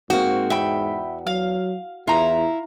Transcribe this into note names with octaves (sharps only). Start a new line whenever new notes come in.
G#2 A#3 C4 F#4
E2 E5 G5 B5
F#3 F5
E2 E4 F4 A#5